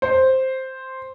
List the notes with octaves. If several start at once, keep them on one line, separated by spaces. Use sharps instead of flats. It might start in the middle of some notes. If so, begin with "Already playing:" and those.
C5